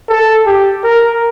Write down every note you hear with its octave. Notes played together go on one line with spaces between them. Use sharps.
A4
G4
A#4